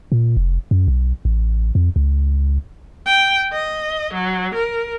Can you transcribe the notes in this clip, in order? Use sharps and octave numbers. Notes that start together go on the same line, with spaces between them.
A#2
F1
F#2
B1
A1
F2
C#2
G5
D#5
F#3
A#4